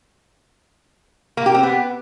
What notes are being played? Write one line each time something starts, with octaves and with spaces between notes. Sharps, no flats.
A#3
G4
C4
B3